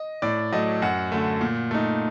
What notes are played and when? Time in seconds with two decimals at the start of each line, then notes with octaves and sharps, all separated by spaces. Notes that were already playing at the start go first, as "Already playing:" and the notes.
Already playing: D#5
0.22 A2 D5
0.52 F#3 A3 D#5
0.82 F#2 F#5
1.12 D3 A3
1.41 A#2
1.71 A3 D#4